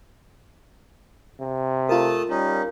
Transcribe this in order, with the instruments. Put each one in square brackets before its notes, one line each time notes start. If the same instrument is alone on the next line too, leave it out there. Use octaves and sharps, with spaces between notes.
[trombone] C3
[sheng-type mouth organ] A3 A5 D#6 [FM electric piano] F4 A#4
[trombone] G3 [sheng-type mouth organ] C#4 D#4